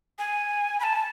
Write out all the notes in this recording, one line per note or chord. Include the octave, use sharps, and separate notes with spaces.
G#5
B5
A5